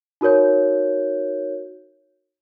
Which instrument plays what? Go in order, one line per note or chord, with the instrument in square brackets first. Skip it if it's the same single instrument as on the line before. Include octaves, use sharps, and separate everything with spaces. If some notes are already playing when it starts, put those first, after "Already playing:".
[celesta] D#4 F#4 A#4 C#5 G6